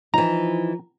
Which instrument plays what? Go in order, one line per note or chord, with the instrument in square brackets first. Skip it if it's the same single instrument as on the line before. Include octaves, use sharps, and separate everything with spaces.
[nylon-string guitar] E3 D#4 [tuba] F3 [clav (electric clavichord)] A#5